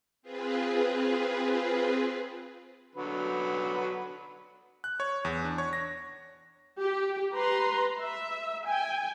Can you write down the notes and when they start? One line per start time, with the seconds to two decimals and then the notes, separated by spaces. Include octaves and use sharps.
0.22 C4 F4 G#4 B4
2.95 D3 F#3 B4
4.84 F#6
5.00 C#5
5.25 E2
5.45 D4
5.58 C#5
5.73 A#6
6.80 G4
7.34 B4 A#5 C6
8.00 E5
8.65 G5 G#5